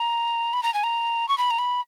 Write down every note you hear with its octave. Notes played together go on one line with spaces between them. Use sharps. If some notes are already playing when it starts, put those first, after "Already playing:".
Already playing: A#5
B5
A#5
G#5
A#5
C#6
B5
A#5
B5